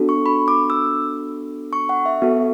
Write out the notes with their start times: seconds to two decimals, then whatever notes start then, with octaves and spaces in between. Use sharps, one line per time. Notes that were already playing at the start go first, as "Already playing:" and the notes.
Already playing: B3 D4 F#4 A4
0.09 C#6
0.26 B5
0.48 D6
0.70 E6
1.73 C#6
1.89 F#5
2.06 E5
2.22 B3 F#4 A4